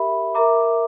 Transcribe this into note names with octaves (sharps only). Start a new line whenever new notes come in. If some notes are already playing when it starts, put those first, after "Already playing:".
Already playing: G4 A#4 E5 B5
A#4 E5 A#5 D6